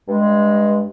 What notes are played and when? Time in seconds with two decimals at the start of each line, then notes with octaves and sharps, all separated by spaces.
0.08 G2 G#3